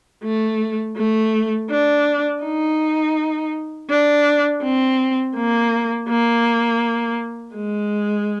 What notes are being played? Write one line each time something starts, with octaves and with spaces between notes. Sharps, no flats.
A3
A3
D4
D#4
D4
C4
A#3
A#3
G#3